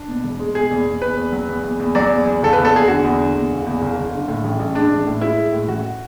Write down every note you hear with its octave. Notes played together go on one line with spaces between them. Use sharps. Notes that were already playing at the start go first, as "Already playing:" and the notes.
Already playing: D4
B2
E1
G#3
B2 G#4
E2
E2
E2 B4
E2
F#3
E2
E2
E2
F#3 D5
E2
E2
F#1 A4
B4
E2
A4
E2 G#4
D3 F#4
E2
D3
E2
F#1
E2
F#1
F#1
D3
A2
A1
A1
G#3 D4
A1
A2
G#3 E4
G#3
A2
A1 F#4